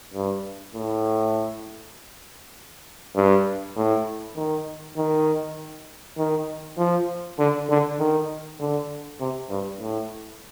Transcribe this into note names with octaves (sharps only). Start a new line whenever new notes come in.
G2
A2
G2
A2
D#3
D#3
D#3
F3
D3
D3
D#3
D3
C3
G2
A2